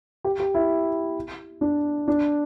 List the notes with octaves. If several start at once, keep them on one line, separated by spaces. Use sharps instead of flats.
G4
G4
E4
D4
D4